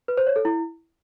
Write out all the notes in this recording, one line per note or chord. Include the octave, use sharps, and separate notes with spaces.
B4
C5
C#5
A4
E4